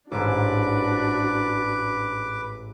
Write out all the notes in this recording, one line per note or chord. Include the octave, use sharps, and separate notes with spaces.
A1 G#2 D4 F#4 B4 D6